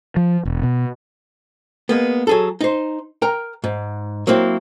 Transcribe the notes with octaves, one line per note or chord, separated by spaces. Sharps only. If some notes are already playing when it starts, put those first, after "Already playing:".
F3
E1
B2
G#3 A#3 B3
F#3 G#4 A4
D#4 C5
A#4 G5 A#5
G#2
F#3 A#3 C4 E4